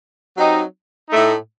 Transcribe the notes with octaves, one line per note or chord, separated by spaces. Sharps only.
F#3 C4 D#4 G4
A2 A3 D#4